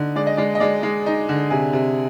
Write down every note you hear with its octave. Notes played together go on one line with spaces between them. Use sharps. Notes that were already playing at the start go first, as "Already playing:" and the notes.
Already playing: D3 D#4
G#3 D5
D#5
G#3 D5
D#5
G#3 D5
G#3
D#4
D3
C3 G#4
C3